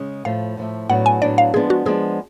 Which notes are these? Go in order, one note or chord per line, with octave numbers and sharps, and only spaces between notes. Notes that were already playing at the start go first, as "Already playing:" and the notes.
Already playing: C#3 G#3
A2 F3 A3 F5
A2 F3 A3
A2 F#3 B3 D4 F#5
G#5
A2 F#3 B3 D4 D5
F5
F3 G#3 B3 D4 G#4
F#4
F3 G#3 B3 D4 G#4